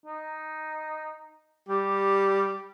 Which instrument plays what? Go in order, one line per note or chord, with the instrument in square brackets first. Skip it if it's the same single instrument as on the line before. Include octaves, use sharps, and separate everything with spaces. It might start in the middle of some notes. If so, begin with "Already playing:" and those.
[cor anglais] D#4
[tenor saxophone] G3 [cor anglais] G4